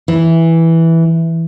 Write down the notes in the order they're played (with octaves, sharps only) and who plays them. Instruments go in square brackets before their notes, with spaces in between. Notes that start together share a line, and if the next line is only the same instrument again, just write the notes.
[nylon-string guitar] E3